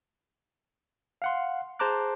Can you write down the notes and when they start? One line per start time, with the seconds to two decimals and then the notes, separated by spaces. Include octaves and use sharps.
1.22 F5 F#5 C6
1.79 G#4 C5 A5 A#5 D6 F#6